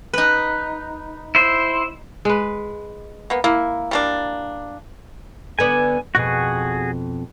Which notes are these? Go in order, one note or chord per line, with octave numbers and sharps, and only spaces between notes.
D#4 B4
E4 C5
G#3 B4
A#3 B3
A#3 E4
G3 A#3 D4
D3 B3 D5 G#5
F2 B2 F#4 G#4